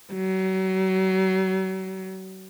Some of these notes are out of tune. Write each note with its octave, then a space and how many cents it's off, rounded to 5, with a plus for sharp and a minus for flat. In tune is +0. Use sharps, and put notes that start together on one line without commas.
F#3 +35